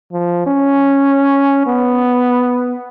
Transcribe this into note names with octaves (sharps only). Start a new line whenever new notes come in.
F3
C#4
B3